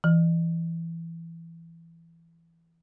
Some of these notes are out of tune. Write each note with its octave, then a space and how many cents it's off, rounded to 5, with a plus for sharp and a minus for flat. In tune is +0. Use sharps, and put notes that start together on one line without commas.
E3 +15